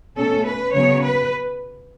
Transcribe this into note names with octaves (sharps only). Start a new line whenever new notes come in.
B2 A3 C#4 A4
B4
C#3 F#3 B3 C#5
B4